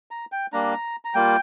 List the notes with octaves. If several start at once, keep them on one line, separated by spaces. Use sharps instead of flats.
A#5
G5
G3 A#3 D4 A#5
A#5
G3 A#3 F4 G5